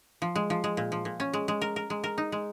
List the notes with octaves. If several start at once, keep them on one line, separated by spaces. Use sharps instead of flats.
F3
G#3
F3
G#3
A#2
F3
A#2
C#4
G#3
G#3
A#4
A#4
G#3
A#4
D#4
G#3